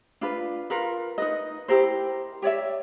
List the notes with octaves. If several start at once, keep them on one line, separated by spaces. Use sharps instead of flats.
D4 F4 B4
F4 A#4 B4
D#4 B4 D#5
E4 G4 A#4 C5
G4 C#5 D5 E5